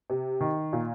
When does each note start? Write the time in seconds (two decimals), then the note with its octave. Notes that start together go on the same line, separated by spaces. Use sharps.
0.10 C3
0.41 D#3
0.73 A#2